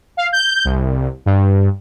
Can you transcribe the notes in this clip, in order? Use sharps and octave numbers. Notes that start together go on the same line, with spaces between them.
F5
G6
C2
G2